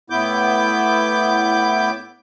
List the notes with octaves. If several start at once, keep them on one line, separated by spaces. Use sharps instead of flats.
A2 B3 E4 D6 G6